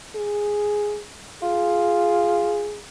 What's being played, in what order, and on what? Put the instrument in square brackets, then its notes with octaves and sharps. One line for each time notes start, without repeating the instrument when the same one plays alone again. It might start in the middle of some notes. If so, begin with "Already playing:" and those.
[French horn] G#4
[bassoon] F4 [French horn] G#4